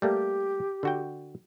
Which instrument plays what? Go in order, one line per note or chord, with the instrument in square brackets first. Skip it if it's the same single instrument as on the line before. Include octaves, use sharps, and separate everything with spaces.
[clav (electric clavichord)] G3 A3 A#3 [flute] G4
[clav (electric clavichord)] D3 F#4 G5